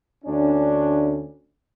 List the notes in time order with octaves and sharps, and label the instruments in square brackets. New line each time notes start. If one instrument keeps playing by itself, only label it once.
[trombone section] D2 C#4 D4